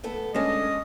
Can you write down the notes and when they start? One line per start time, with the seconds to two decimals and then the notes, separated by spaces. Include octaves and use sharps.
0.03 A3 B3 A4
0.34 D3 G#3 A3 C#4 D#5